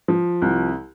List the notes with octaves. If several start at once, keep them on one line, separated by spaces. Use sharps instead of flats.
F3
C2